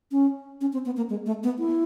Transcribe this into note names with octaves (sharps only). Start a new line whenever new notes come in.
C#4
C#4
C4
B3
A#3
G#3
A3
B3
E4